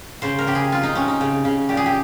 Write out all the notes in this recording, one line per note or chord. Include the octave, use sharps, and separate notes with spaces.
C#3 C5
A#4
C#3 G4
G#4
C3 F4
D#4
C3 C#4
D#4
C#3
C#3
A#2 G4
G#4
G4